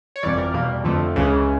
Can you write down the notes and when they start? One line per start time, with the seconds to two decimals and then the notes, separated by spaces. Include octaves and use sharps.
0.16 C#5
0.23 G1 F2 C3 E3 G3 D5
0.38 A#4
0.54 E2 B2 G3 A#3
0.84 F2 D3 F3 A3
1.16 C#2 C#3 E3